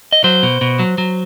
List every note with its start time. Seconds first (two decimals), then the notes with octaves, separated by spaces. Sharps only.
0.12 D#5
0.24 F#3 C5
0.43 B2
0.61 B2
0.79 F#3
0.98 F#3